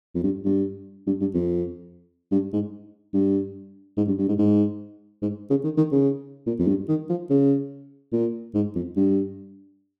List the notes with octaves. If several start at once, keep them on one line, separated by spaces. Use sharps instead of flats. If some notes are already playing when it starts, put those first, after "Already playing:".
F2
G2
G2
G2
G2
F2
G2
G#2
G2
G#2
G2
G2
G#2
G#2
G#2
C#3
D#3
D#3
C#3
A#2
F2
G2
D#3
F3
C#3
A#2
G#2
F2
G2